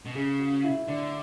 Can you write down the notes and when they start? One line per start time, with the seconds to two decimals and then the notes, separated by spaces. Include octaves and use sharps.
0.05 B2
0.15 C#3 G#4
0.39 F#4
0.64 E4
0.88 D3 D4